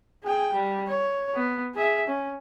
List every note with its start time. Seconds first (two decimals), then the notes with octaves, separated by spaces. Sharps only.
0.24 G#4 G5
0.54 G3
0.87 C#5
1.35 B3
1.75 G#4 E5
2.08 C#4